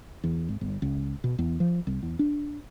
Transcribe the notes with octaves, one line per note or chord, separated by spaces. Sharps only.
E2
G#1
G1
C#2
B2
E2
F3
C2
E2
D4